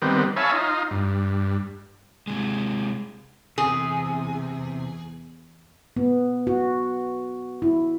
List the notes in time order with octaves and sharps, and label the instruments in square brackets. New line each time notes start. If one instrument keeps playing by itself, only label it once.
[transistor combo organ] D#3 G3 B3 C4
C#5 E5 F5 G#5 A5 B5
D#4 F4
G2
[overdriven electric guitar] C3 G#3
[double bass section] E2 [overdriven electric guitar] C3 [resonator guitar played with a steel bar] G#4
[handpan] B3
F#4
E4